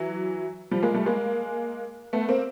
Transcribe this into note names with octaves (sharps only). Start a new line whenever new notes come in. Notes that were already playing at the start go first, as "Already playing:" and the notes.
Already playing: E3 F#3
F3 G3
G#3 A#3
G3 A3
G#3 A#3
A3 B3
A#3 C4